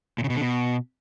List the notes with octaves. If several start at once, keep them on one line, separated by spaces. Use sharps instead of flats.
A#2
C#3
B2
D3
B2